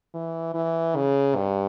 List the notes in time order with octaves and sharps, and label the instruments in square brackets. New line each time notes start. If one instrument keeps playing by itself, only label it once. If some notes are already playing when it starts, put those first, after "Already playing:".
[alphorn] E3
E3
C#3
G2